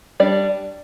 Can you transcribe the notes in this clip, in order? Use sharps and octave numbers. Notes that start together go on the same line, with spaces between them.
G3 D4 D5